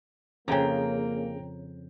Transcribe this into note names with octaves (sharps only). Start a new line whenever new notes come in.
F2 C#3 A#3 C#4 G#4 G5 A#5